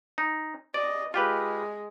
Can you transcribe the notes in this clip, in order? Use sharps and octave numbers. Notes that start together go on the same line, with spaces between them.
D#4
D5 D#5
G#3 F4 G4 B4